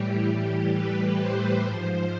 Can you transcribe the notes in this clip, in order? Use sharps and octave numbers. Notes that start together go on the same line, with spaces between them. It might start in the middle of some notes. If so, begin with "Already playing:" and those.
Already playing: A2 E3 G3 G4
B4
C5
G#2 F3 C5